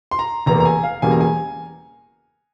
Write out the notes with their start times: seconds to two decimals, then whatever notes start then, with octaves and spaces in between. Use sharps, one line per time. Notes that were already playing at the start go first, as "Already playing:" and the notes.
0.11 C6
0.19 A#5
0.46 F1 E2 E3 A#3 A#5
0.60 A#5
0.65 G#5
0.83 F5
1.02 E1 E2 C#3 G3 A#3 G#5
1.11 A#5
1.21 G#5